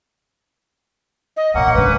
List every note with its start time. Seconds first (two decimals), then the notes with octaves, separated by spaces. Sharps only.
1.37 D#5
1.54 A#1 E2 A#3 C#4 F#5
1.75 G2 C#3 B4